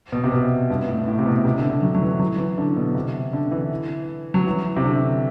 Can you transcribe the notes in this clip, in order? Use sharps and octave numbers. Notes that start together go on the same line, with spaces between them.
B2
C3
B2
G2
A2
A2
C3
B2
C3
D3
D3
F#3
F#3
E3
F#3
E3
D3
B2
C3
D3
E3
F#3
E3
C3
D3